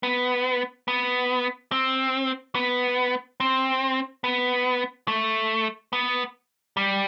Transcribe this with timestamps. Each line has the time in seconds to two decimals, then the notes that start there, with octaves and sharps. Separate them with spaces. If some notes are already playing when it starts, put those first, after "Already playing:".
0.03 B3
0.88 B3
1.72 C4
2.55 B3
3.40 C4
4.24 B3
5.08 A3
5.93 B3
6.77 G3